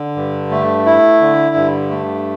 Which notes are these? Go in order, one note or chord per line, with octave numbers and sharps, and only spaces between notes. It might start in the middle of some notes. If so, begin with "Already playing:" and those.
Already playing: D3
G2
A3
E4
D3
G2
A3